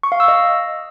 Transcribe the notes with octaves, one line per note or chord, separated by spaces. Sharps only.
C#6
F5
E6
D#5